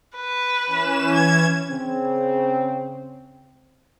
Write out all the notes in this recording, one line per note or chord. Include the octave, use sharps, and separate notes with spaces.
B4
E3 C#4 E7
G#6
C#3 C4